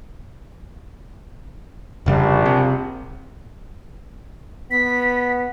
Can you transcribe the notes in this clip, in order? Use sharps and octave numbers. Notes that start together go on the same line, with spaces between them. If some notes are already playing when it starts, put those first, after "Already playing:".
F1 A#1 C#3 G3
C3
B3 B6